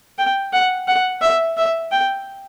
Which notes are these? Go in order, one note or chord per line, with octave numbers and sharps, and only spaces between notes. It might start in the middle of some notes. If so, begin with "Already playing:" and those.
G5
F#5
F#5
E5
E5
G5